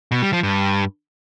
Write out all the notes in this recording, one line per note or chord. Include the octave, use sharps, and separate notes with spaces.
B2
G3
F3
G2